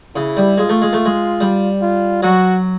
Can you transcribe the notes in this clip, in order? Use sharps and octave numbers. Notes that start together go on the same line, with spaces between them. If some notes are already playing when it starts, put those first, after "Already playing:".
C#3 E4
G3
G#3 F4
A3
G#3
A3
G#3
G3
F4
F#3 F#4